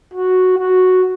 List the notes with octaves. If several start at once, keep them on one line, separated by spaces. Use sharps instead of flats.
F#4
F#4